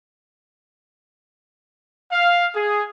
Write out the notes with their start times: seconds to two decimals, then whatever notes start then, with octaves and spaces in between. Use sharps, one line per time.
2.11 F5
2.55 G#4